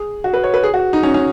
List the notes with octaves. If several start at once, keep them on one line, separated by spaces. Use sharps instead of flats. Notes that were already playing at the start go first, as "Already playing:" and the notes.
Already playing: G#4
F#4
B4
C#5
B4
G#4
F#4
D#4
C#4
C#4